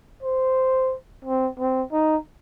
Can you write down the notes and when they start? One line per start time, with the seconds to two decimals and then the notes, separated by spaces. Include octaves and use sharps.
0.23 C5
1.25 C4
1.59 C4
1.92 D#4